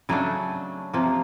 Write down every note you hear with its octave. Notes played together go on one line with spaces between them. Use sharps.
C#3 F#3 A3 D4 G#4
C3 F3 A#3